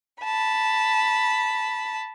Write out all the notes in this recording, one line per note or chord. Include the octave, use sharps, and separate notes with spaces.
A5 B5